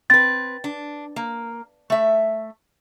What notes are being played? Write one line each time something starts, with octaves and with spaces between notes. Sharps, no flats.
C4 B4 A6
D4
A#3
A3 E5